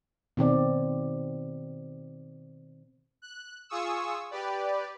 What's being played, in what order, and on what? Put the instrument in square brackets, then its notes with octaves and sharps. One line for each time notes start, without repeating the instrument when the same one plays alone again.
[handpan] B2 D#3 C4 D5
[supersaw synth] F#6
F4 G#4 C#6 D#6 E6
G4 B4 D5